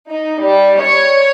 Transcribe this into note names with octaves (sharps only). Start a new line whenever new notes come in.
D#4
G3
C#5